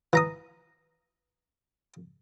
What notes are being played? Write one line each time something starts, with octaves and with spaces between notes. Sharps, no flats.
E3 A#5 D#6